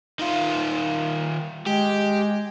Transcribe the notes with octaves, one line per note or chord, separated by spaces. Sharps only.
D#3 F4
G#3 G4